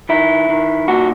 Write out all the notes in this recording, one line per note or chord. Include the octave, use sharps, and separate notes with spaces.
D#3 E4
D#3
A#2 F#4